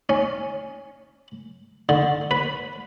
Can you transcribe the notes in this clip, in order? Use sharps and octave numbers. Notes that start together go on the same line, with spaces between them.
C#4
D3
B4